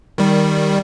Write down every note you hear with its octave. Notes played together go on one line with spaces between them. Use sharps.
D#3 G3